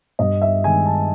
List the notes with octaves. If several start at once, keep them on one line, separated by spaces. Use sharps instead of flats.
G2 D#5
E5
D#3 G#3 G#5
A5